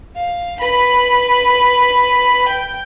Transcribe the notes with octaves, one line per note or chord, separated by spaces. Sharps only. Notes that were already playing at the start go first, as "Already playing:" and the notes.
F5
B4 B5
G5